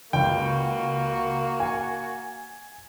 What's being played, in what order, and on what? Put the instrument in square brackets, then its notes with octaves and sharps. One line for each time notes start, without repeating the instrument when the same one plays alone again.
[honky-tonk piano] C#2 [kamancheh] A#3 F#4 [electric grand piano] G5
[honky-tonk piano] G#5